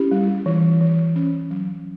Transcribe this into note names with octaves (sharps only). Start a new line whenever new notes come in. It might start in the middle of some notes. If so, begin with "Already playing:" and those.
Already playing: C#4 E4 G4
G3
E3
E3
C#4
F#3